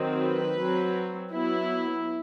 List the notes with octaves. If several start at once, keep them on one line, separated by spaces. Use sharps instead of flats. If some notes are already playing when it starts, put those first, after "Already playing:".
Already playing: D#3 F#3 C4
B4
F#3 C4
F#3 B3 E4